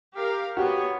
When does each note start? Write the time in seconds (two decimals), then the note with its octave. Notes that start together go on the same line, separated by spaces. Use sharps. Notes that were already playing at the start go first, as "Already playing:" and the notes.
0.16 G4 A#4 F5
0.57 B3 F#4 G4 C#5